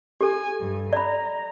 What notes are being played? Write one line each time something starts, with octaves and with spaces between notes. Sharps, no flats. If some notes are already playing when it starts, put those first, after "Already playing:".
G4 A4 G#5
G2
D5 A#5 B5